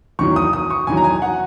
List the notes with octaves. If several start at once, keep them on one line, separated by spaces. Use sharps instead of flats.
E2 D#3 F#3 C#6
D#6
D#6
C#6
E2 D#3 F#3 G#5
A#5
G#5
F#5